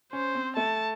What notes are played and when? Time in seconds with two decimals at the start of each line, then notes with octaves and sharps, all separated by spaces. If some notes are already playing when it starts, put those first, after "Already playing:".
0.13 C#4 C5
0.35 C4
0.57 A3 A5